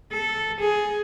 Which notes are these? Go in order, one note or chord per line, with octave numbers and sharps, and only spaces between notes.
A4
G#4